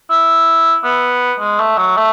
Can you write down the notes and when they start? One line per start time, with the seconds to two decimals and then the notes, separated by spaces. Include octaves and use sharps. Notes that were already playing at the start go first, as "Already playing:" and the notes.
0.10 E4
0.84 B3
1.40 G#3
1.60 A3
1.78 F#3
1.97 A3